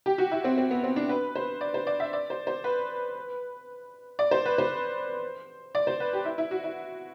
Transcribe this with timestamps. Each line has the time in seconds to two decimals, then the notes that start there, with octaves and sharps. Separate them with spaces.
0.06 G4
0.18 F#4
0.31 E4
0.44 C4
0.58 C4
0.71 B3
0.84 C4
0.96 D4
1.09 B4
1.36 C5
1.61 D5
1.74 C5
1.87 D5
2.00 E5
2.13 D5
2.30 C5
2.47 C5
2.64 B4
4.19 D5
4.31 C5
4.46 B4
4.58 C5
5.75 D5
5.87 C5
6.00 B4
6.13 G4
6.25 E4
6.38 E4
6.51 F#4
6.64 E4